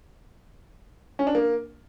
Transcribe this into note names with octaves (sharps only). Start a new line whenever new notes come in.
C#4
D4
A#3